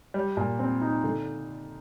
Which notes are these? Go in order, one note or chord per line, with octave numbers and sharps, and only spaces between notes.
G3
A#2
C4
D#4
D3